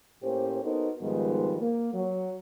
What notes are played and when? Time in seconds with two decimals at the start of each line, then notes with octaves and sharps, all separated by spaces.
0.23 A2 A#3 C#4 G4 C5
0.63 B3 D#4 F#4 A4 A#4 C5
1.02 G#2 D#3 F3 G3 G#3 B3
1.61 A#3
1.94 F#3